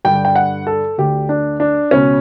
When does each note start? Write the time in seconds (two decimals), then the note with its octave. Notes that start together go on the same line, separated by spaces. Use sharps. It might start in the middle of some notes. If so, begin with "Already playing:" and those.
0.05 G2 D3 G5
0.25 G5
0.35 F#5
0.67 A4
0.98 D2 D3 G4
1.29 D4
1.60 D4
1.91 C#2 B2 C#4